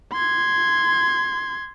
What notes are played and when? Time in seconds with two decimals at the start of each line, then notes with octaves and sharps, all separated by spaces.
0.13 C6 G#6